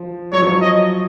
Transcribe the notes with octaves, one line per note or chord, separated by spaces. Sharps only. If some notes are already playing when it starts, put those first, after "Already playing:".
Already playing: F3
F#3 C#5
F3
F#3
D#5